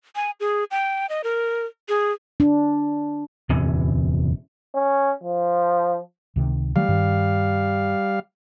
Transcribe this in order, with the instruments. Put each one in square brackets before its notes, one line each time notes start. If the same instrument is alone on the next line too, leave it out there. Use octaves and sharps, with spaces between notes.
[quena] G#5
G#4
G5
D#5
A#4
G#4
[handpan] D4
[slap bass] D1 E2 C3 C#4
[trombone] C#4
F3
[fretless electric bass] C#2 C3 D#3
[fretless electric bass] D#3 F#3 A3 [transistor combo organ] G3 F5
[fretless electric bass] G2 D#3